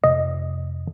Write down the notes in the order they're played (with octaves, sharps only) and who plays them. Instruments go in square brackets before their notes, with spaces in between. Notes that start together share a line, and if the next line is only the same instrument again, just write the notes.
[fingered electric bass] F2 C3 A3 [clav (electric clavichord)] D#5